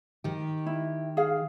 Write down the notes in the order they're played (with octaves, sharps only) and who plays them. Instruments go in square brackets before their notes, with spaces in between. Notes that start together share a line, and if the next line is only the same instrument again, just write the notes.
[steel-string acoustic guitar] D#3 G4
[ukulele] E4
G#4 F5